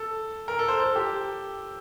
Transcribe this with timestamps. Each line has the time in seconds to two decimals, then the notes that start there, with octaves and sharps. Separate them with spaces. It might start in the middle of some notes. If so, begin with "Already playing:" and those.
Already playing: A4
0.48 A#4
0.59 A4
0.68 C5
0.79 A4
0.95 G4